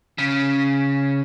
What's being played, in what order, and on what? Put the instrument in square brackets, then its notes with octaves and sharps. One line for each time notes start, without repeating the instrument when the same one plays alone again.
[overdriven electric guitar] C#3